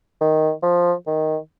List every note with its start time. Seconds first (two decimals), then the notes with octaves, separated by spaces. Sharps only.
0.21 D#3
0.63 F3
1.07 D#3